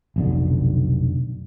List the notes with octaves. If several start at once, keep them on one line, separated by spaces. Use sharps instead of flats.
F1 B1 D3